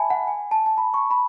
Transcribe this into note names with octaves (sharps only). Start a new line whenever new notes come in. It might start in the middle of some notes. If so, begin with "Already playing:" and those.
Already playing: E5 G#5 A5 B5
F#5
G#5
A5
A5
B5
C#6
B5